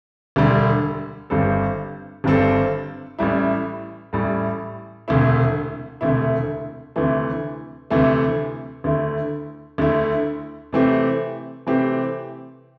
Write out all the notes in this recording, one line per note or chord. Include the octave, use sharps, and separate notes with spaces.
E1 D2 D3 G3
G1 G2 G3 C4 A4
G1 G2 G3 C4 A4
A1 A2 G3 E4
A1 A2 G3 E4
E1 D2 C3 A3 E4
E1 D2 C3 A3 E4
D2 C3 E3 A3
D2 C3 E3 A3
D2 D3 A3 E4
D2 D3 A3 E4
C3 E3 A3 C4 G4
C3 E3 A3 C4 G4